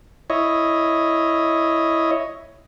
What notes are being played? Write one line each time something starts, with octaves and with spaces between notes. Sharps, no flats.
E4 C#5 D#5